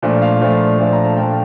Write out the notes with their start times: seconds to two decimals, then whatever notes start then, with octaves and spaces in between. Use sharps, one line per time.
0.02 A#2 F3 A3 D4
0.22 F5
0.41 A#2 F3 A3 D4
0.79 A#2 F3 A3 D4
0.93 A#5
1.05 A5
1.17 A#2 F3 A3 D4 G5